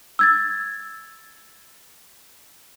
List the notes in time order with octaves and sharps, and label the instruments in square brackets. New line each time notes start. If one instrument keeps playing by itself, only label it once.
[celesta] E6 G#6 A6